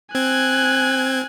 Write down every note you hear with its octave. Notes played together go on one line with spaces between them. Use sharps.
C4 G#5 F#6 G#6